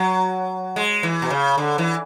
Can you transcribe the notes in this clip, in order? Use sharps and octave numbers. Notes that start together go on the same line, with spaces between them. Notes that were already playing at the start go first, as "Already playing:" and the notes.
Already playing: F#3
G#3
E3
B2
C#3
D3
E3